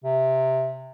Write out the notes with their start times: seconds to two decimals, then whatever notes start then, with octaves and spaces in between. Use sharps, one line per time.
0.04 C3